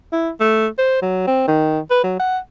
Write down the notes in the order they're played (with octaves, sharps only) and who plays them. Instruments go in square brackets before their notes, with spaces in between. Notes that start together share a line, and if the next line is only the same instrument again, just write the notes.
[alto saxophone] E4
A3
C5
F#3
C4
D#3
B4
F#3
F#5